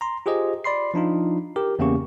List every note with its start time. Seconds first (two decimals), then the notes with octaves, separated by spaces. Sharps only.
0.01 A#5 C6
0.26 F4 G4 G#4 C5 D#5
0.64 D5 B5 C6 C7
0.94 F3 D4 D#4 F4
1.56 G4 A#4
1.79 E2 C#3 A#3 C#4 G4 C#6